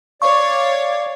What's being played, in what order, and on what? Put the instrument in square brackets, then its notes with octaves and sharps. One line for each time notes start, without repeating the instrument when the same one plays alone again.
[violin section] C#5 [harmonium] D5 [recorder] F5 [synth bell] C#6